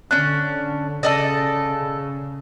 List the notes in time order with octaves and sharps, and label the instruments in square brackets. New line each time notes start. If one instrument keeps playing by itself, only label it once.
[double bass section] D3 [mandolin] C#4 D4 [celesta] F#6
[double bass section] C#3 [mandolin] A4 D5 D#5